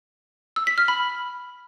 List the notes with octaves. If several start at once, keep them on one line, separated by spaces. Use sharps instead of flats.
E6
B6
F6
B5